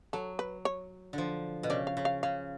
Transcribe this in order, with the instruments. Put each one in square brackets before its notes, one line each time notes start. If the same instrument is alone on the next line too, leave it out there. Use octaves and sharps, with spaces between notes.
[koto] F#3 [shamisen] A4
[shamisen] B4
C#5
[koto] D3 F3
B2
[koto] C#3 [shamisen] D5
[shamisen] F5
[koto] C#3
[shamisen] F5
[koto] C#3 [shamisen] F5